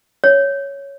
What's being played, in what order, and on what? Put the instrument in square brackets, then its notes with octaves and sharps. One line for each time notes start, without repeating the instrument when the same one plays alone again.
[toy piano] C#5